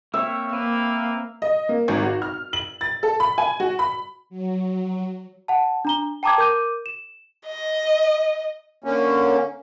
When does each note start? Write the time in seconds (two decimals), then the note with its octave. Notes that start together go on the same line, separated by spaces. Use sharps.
0.14 A#3 C4 C#5 E5
0.53 A#3 C4 A#4 B4
1.42 D#5
1.69 A#3
1.88 G#1
2.03 F#4
2.22 F6
2.53 F#7
2.81 A6
3.03 A4
3.20 B5
3.38 G#5
3.60 F#4
3.79 B5
4.30 F#3
5.48 F#5 A5
5.85 D4 A#5 G7
6.23 G5 A5 A#5 D6 D#6 G#6
6.38 A#4 D6 G6 D#7
6.86 E7
7.46 D#5
8.84 D3 A#3 C#4